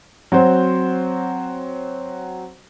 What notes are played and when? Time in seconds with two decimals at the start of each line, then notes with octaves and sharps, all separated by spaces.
0.32 F#3 C4 F#4 C5